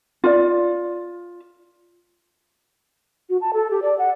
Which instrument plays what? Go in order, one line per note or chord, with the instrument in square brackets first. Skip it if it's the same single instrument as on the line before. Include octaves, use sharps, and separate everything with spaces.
[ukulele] F4 D5
[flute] F#4
A5
A4
G4
D5
F#5